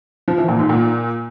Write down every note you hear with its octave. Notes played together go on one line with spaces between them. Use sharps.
F3
E3
A#2
G#2
A#2